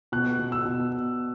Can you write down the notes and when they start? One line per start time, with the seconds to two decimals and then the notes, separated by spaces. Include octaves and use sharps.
0.12 B2 F#6
0.39 B2
0.52 E6
0.65 B2